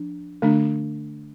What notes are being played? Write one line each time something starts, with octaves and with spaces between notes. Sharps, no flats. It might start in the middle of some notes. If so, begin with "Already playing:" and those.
Already playing: F3 D4
D3 A3 D4